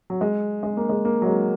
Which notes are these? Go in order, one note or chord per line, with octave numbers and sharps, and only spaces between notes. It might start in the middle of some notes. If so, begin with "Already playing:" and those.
F#3
G#3
G#3
A#3
G#3
A#3
F#3
G#3